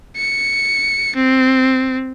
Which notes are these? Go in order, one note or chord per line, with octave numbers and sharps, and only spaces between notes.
C#7
C4